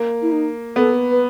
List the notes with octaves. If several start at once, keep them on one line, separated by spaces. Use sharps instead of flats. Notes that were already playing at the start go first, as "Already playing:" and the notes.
Already playing: A#3
E4
D#4
B3 A4
B4